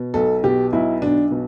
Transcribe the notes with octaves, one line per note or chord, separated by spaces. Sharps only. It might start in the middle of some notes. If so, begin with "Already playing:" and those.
Already playing: B2
B1 A4
B2 G4
B1 E4
B1 D4
B2